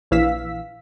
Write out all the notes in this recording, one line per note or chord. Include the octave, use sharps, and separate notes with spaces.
A#1 E3 F5 E6 B6